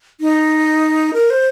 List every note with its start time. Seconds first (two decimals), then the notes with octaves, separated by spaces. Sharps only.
0.21 D#4
1.14 A#4
1.30 C5